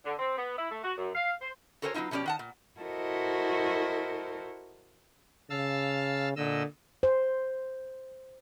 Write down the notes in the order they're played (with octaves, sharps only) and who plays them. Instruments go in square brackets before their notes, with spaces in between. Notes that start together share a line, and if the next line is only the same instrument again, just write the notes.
[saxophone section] D3
C4
B3
E4
A3
F#4
F#2
F5
C5
[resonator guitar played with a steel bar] F#4 A4 A#4 C5 C#5 G#5
F#3 B3 C#4 D#4 F4
B2 F3 C#4 G4 D5
D#3 F#5 A5
A#2
[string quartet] E4 F#4 A4 A#4 C5 D#5
[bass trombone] C#3 [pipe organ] F5 A5 E6
[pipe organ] A#2 D#5 E6 [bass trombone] D3
[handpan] C5